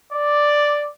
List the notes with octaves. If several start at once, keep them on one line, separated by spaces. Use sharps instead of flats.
D5